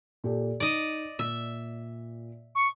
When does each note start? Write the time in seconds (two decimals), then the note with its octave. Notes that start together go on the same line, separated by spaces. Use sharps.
0.24 A#2 G4 A4
0.60 D#4 D5 D#5
1.19 A#2 E5
2.55 C#6